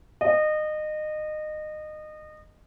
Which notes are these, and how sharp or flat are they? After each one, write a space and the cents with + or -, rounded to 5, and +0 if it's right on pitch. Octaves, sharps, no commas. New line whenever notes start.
D#5 -25